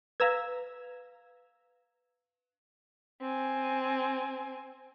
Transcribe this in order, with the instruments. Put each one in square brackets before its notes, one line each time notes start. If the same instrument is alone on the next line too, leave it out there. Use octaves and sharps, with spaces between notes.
[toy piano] B4 F5 [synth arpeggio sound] A#5 E6 G#6
[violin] C4 G#5